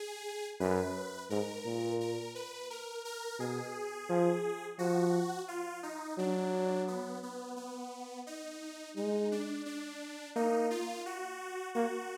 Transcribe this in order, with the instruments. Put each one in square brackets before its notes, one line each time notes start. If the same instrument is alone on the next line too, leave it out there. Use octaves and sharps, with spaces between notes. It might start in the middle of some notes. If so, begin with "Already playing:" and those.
Already playing: [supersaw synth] G#4
[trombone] F#2 [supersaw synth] B4
[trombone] G#2 [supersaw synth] A#4
[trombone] A#2
[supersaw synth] A#4
B4
A#4
A#4
[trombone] B2 [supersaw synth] G#4
[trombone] F3
[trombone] F3 [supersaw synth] F#4
[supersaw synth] F4
D#4
[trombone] F#3 [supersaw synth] D4
[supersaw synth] B3
B3
B3
D#4
[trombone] G#3 [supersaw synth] D#4
[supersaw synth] D4
D4
[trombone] A#3 [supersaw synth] D#4
[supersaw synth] F4
F#4
[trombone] A#3 [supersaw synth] F#4